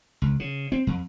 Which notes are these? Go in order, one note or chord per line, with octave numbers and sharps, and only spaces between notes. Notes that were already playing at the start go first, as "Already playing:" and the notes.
C#2
C#3
C4
F2